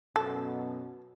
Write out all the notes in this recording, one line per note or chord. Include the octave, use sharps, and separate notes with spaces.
F#2 B2 A4